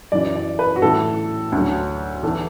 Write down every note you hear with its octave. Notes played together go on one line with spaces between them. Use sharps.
F#2 E3 D5
D5
B4
F#4
A2 E3 A4
D2 D3 F#3
E2 E3 A4